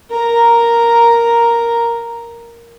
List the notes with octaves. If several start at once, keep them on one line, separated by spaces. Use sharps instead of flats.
A#4 A#5